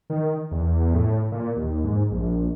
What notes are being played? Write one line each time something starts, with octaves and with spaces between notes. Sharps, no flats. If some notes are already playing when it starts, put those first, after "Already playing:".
D#3
E2
A2
A#2
D#2
G#2
A#1